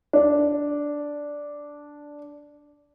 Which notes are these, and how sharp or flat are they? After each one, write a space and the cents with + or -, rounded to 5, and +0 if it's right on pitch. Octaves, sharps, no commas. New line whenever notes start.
D4 -5